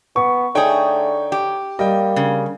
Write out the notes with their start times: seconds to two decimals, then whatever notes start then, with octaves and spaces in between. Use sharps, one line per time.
0.16 B3 C#6
0.55 D3 A3 D#4 G#4 C#5 G5
1.32 G4
1.79 G3 A#3 D#5 G5
2.16 C#3